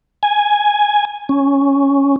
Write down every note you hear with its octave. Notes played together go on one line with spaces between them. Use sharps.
G#5
C#4